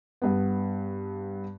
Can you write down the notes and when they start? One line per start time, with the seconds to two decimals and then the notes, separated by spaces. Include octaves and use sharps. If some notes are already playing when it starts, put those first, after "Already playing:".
0.22 G2 B3